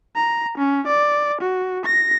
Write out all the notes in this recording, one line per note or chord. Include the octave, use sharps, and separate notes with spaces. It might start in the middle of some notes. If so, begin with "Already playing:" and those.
A#5
C#4
D5
F#4
A#6